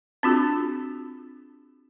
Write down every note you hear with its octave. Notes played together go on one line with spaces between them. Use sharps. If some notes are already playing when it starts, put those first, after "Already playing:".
C4 D4 F4 F#4 G#4